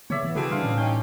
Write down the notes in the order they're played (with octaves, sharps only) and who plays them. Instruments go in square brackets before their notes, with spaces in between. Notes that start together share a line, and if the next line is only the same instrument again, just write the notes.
[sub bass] C#3 [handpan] B3 [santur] C#5 D5 E5
[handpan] E3 B3
[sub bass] C#3 [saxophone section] E3 C4 G#4 [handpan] E4 F#4 A4
[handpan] G3 D4 [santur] F5 C6
[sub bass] A2 [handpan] C#4
[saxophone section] C#4 [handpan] D#4 [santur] G5